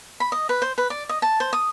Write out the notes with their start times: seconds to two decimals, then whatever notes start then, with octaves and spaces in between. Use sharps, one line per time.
0.20 B5
0.32 D#5
0.49 B4
0.62 C5
0.78 B4
0.90 D5
1.09 D#5
1.22 A5
1.40 C5
1.53 D#6